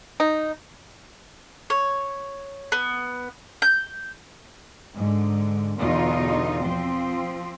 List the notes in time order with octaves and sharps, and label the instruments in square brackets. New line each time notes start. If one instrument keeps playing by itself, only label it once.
[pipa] D#4
[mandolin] C#5
B3
G6
[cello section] G#2 D3
E2 B2 D3 D#4 F4
F3 C4